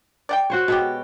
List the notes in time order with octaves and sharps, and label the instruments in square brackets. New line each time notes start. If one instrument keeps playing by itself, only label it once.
[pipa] D5 F#5 G5
[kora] F#4 C5 C#5
[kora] B2 [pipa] G#3 B3 G4